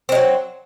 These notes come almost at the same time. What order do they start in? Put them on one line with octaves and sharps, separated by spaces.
C4 G#3 F#3